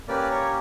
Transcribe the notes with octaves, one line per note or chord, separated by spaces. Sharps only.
A#3 C#4 G4 B4 D5
A#4 C#5